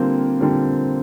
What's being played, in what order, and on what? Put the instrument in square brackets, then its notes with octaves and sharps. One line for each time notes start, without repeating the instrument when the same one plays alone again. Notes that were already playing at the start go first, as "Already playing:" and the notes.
Already playing: [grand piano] D3 G3 A#3 F4 [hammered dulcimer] C4
[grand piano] D3 G3 A#3 F4